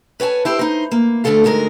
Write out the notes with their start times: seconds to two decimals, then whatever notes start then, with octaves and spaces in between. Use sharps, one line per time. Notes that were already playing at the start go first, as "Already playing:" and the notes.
0.20 B4 C#5 F#5 G#5 A5
0.45 E4 G4 C5
0.59 D#4 C5
0.92 A#3
1.24 D2 G#2 D3 A3 A4 F5
1.44 D2 G#2 G#3 A#4